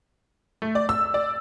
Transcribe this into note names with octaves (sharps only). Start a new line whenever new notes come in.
A3
D5
E6
D5